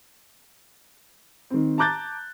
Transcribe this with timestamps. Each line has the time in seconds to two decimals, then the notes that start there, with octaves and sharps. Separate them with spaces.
1.50 D#3 C4
1.78 A5 A#5 D6 F#6 G6 A6